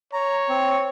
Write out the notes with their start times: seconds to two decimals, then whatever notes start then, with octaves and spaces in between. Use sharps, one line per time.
0.13 C#5 A#5
0.49 C4